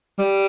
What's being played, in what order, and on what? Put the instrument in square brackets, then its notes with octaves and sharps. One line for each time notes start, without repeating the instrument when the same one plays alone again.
[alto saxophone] G3